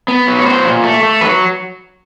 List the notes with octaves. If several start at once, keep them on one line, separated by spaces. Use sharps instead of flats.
B3
F#3
C#5
F#3 C5
A#2
A3
A3
F#3 B4